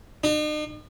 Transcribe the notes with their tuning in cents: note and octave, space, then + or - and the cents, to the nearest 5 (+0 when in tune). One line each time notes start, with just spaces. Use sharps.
D#4 -45